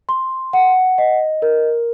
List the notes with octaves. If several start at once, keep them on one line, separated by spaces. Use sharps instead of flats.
C6
F#5
D#5
A#4